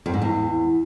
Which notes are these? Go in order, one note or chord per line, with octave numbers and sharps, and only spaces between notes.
F2
G#2
E2